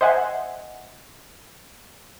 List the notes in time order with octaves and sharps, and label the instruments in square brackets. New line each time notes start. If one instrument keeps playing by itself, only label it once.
[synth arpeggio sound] C5 D#5 E5 F#5 G#5